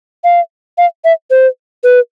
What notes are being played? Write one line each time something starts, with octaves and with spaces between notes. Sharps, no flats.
F5
F5
E5
C5
B4